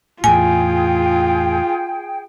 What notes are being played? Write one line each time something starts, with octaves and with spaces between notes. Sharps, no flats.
E2 A2 F4 G#4 G5 G#5